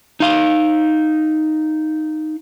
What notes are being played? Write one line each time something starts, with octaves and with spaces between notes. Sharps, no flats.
D#4 F5